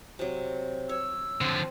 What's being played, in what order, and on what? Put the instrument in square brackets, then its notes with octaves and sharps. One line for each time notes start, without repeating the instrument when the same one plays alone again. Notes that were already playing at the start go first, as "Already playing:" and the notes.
[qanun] C3 F#3
[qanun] C#5 [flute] E6
[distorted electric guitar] D3 F3 [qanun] C4